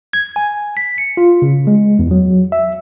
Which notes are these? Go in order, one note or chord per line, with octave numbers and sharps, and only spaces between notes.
G#6
G#5
B6
C#7
F4
C#3
G#3
E2
F#3
E5